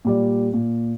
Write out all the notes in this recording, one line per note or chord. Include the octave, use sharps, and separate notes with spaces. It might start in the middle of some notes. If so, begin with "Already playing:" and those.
A#2 G3 D5
A#2